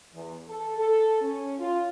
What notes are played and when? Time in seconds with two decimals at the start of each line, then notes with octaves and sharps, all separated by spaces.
0.14 E2
0.48 A4
0.77 A4
1.21 C#4
1.59 F4